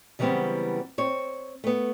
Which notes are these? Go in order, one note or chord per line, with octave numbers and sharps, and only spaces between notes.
C#3 E3 F#3 G3 B3 C4
C4 C#5
A3 B3